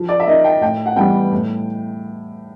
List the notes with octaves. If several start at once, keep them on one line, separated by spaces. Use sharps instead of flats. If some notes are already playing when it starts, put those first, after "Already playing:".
Already playing: F3
D5
E5
A#3 D#4 D#5
G5
A2 G5
F#5
E3 G3 B3 G5
A2